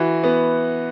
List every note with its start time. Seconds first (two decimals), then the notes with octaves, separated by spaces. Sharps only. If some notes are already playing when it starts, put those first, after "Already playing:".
Already playing: E3 F#4
0.23 B3